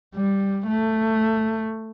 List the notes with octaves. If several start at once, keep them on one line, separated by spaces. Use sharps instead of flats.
G3
A3